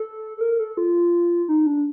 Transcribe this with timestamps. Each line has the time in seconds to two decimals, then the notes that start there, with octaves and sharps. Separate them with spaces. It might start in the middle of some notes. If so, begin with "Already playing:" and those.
Already playing: A4
0.37 A4
0.41 A#4
0.59 A4
0.77 F4
1.48 D#4
1.66 D4